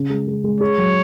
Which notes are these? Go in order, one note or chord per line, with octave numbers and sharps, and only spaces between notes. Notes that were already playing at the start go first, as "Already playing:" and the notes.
Already playing: C#3
G#3
G#3
G#3
G#4 C#5
F#3